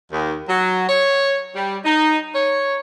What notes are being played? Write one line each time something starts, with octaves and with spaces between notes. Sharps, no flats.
D#2
F#3
C#5
G3
D#4
C#5